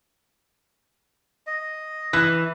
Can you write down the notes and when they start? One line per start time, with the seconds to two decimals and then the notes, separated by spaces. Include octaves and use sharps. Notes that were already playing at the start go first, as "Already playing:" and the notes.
1.47 D#5
2.13 E3 F#6